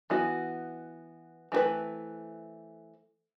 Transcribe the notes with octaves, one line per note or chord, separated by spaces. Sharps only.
E3 B3 F#4
E3 A3 C4 F#4 B4